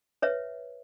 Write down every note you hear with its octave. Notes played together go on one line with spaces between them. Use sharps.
B4 C#5 E5